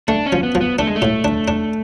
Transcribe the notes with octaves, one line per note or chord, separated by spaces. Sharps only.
A3 D4
C#4
F3
B3
F3
B3
A3 D4
G#3
A3
A2
D4
D4